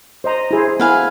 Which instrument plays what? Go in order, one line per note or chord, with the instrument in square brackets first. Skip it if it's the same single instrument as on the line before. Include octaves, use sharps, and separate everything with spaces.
[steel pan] C5 D#5 A#5
E4 G#4 C5
[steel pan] B3 E4 [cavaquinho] B4 F5 G#5